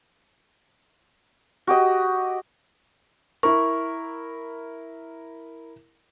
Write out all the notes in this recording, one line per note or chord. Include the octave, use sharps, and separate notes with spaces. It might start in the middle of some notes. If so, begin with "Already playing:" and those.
F#4 G4 D#5
E4 A#4 C#6